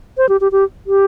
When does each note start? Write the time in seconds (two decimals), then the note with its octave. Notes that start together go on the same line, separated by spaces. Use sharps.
0.17 C5
0.29 G4
0.41 G4
0.52 G4
0.87 G4